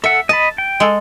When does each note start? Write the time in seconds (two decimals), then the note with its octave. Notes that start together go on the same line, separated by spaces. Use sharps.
0.04 A4 E5 F#5
0.29 D#5 A5 B5
0.58 G5
0.80 G#3 A4